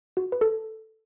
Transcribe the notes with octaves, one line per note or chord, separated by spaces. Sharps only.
F#4
B4
A4